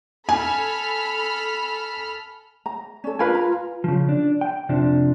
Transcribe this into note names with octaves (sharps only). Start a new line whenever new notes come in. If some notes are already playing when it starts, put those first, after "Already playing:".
A4 G#5 B5 F6
A#5
C#4 A4 D5
D4 F4 A#4 B4 F5 G#5 B5
A#5
C#3 F3
D4
G5
F2 C3 F3 D4